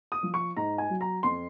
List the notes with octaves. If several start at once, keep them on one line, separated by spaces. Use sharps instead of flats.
D#6
F3
C#6
G#2 A#5
G#5
F#3
A#5
F2 C6